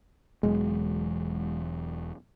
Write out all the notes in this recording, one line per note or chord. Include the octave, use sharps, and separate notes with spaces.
E1 E2 F#3 G#3